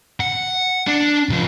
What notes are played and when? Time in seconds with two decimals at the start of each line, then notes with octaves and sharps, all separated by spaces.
0.20 F#5
0.87 D4
1.29 C3 F3